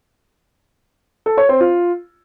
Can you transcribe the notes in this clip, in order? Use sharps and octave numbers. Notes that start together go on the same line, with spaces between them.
A4
C#5
C4
F4